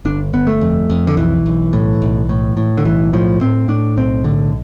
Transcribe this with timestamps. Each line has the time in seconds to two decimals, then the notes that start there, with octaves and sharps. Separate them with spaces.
0.05 G1 D4
0.33 G1 B3
0.47 A3
0.61 F2
0.90 F2
1.07 D3
1.17 B1 E3
1.46 B1
1.73 A2
2.02 B1
2.29 A2
2.57 A2
2.77 D3
2.85 B1 E3
3.13 A2 F3
3.41 A2 C4
3.68 A2 D4
3.97 B1 C4
4.24 A2 D3